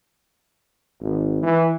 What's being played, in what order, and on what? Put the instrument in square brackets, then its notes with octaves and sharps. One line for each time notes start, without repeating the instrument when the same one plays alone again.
[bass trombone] G#1
E3